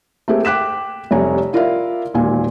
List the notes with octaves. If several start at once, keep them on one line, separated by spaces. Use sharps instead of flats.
A3 A#3 C4 G4 G#4
G5 D6 F#6 B6 E7
F1 C3 G3 C#5 G#5 A#5
E4 F4 A#4 D5 E5 F5
E1 D#2 A#2 D#3 G#5